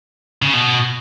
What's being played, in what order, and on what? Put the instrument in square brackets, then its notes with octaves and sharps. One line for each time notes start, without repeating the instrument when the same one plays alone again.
[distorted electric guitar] C#3
B2